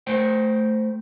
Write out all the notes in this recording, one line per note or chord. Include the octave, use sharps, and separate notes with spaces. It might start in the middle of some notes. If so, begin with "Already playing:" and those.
A3 C5 G5